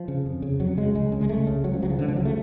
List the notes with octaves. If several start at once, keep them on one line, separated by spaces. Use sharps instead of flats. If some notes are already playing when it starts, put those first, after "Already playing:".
Already playing: F3
C#3
F2
C#3
F2 F#3
C#3 G#3
C#2 G#3
C#3
G#3
C#2 A3
C#3
C#2 F#3
F3
C#3 F#3
F3
C#2 D3
F3
C#3 F#3
A3